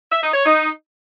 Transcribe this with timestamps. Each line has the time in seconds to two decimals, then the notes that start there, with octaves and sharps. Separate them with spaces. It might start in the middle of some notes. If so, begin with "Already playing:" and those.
0.11 E5
0.22 D#4
0.34 C#5
0.45 D#4